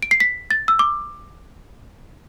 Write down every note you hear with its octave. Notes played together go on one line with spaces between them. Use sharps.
D7
C7
B6
A6
E6
D6